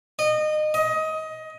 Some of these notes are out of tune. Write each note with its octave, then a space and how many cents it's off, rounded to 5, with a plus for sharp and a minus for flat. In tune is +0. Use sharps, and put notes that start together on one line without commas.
D#5 -25
D#5 +20